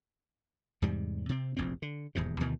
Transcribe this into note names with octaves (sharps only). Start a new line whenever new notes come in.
E2 G#2 C3 G3
C3 C4
F1 A#1 E2 C4
D3
D#1 E2 G#2 C3
D2 B2 D#3 E3